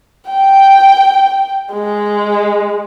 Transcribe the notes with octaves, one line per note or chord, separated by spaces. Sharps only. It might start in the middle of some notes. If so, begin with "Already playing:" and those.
G5
G#3